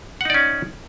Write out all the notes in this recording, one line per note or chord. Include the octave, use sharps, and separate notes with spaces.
C#4 D#4 D5 F#5